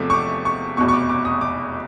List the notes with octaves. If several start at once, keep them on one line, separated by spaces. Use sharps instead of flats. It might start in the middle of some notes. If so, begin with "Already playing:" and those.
Already playing: E2 C3 F3 A3 D6
C#6
D6
C#6
F1 E2 B2 C#6
C#6
D6
D6
D#6
D6